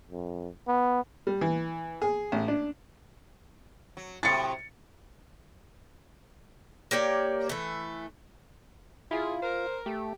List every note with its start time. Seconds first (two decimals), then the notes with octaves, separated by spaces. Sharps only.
0.11 F2
0.68 B3
1.27 G3
1.41 E3
2.02 G#4
2.32 A1
2.48 D4
3.97 F#3
4.23 A2 C3 F#3 A6 C#7
6.91 A#3 G4 C#5 D5
7.49 E3 A3
9.11 C3 E4 F4 G#4
9.42 A#4 C5
9.86 A3 G4